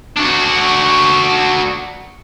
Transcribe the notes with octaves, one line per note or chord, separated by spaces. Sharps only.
D4 F#4